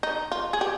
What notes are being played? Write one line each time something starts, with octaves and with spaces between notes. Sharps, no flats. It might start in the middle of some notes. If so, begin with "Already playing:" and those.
D#4
F4
G#4
G4